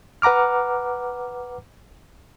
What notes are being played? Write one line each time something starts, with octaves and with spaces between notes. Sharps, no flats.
B4 F#5 A#5 D6 F6